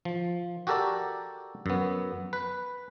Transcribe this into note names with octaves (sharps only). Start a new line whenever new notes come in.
F3
F#4 G4 A4 A#4 D5
F#2 B3
B4